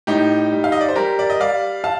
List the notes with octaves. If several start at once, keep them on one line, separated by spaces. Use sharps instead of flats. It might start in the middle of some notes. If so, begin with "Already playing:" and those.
A2 D#4 G4
G3
F5
D#5
D5
C5
G3 G4 A#4
D5
D#5
G3 D5 F5
F5 A5